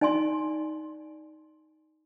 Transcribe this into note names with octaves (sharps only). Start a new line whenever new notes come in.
D#4 D5 G#5 A5 C6